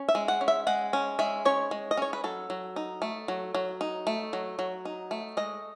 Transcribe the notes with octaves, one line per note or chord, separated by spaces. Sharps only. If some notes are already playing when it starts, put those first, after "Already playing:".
Already playing: C#4
E5
G#3
F#5
C#4
E5
G#3 F#5
C#4
G#3 E5
C#4 C#5
G#3
D#5
C#4 C#5
B4
F#3 A4
F#3
D#4
A3
F#3
F#3
D#4
A3
F#3
F#3
D#4
A3
G#3 D#5